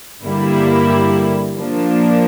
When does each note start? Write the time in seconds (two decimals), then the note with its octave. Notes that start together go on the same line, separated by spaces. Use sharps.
0.23 G2 D3 G3 A#3 E4
1.57 F3 A#3 D4